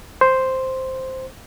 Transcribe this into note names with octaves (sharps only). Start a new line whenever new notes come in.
C5